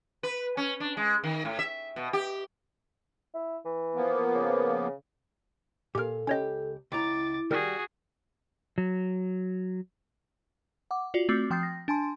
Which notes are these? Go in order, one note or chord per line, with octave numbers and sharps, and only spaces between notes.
B4
C#4
D4
G#3
D#3
A2
E5
B2
G4
E4
E3
F3 A#3 B3
C#3
A#2 G4 A4 A#4 F5
C#2 C#4 G4 C#5 D#5
C#2 E4 A#5 D6 A6
D#3 G3 F#4 G#4 A#4 A#6
F#3
F#5 D6
F4 F#4 D5
A3 C4 F#4 D6
F3 G5 D#6 G6 A6 C7
A#6
D4 G#5 A5 C6